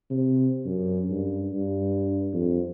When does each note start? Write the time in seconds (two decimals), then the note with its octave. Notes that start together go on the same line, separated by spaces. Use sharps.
0.10 C3
0.66 F#2
1.10 G2
1.52 G2
2.33 F2